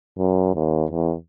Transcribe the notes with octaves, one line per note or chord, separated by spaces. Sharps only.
F#2
D#2
E2